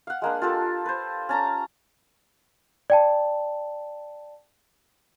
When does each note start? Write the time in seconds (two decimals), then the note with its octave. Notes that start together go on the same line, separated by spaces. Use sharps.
0.07 F5 F#5
0.22 G#3 A#3 D4
0.42 F4 G4 A4 A5
0.86 B4 C5
1.29 C#4 A5 A#5
2.90 D5 G5 A5